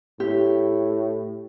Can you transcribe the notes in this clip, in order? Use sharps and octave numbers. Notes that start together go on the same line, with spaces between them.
A2 G4